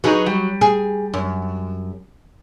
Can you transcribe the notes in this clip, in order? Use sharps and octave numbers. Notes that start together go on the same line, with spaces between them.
F#3 D#4 G#4 B4
G3
G#4
F#2